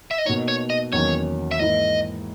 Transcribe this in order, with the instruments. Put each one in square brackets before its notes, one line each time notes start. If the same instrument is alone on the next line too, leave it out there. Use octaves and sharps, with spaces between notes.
[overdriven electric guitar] E5
D#5
[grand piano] B2 A#3 D#4 [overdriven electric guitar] C#5
[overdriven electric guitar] C#5
D#5
[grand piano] E2 D#3 F#3 A#3 C#4 [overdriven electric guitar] C#5
[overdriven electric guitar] E5
[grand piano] G#2 E3 A#3 E4 [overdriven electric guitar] D#5